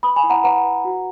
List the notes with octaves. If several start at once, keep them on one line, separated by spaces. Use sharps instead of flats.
B4 B5 D#6
G#5 B5
E4
F#5 A#5
B4 F#5 A#5
B4
F#4